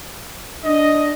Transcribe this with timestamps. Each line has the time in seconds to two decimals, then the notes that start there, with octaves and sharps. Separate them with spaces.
0.65 D4 D#5